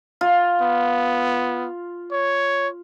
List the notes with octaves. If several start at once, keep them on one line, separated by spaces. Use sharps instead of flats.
F4
B3
C#5